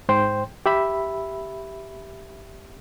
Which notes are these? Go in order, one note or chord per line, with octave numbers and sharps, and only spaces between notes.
G#2 C5 G5
G4 E5 B5